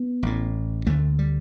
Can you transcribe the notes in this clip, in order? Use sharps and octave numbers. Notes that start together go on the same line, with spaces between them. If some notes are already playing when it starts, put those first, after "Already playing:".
Already playing: B3
A1 A2
D2 D3 A3
G3